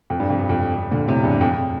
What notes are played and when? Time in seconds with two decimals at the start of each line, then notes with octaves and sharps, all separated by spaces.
0.10 F2
0.20 G2
0.30 F2
0.39 G2
0.49 F2
0.76 F2
0.91 A#2 D3
1.07 A2 C3
1.24 E2 G2
1.41 F2
1.51 F2